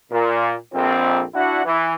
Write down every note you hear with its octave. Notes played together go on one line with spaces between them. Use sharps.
A#2
A#1 F2 C4
D4 E4 F#4 F#5
E3